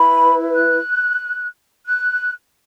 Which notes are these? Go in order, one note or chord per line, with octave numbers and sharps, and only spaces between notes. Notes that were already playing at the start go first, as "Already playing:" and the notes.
Already playing: E4 B4 B5
F#6
F#6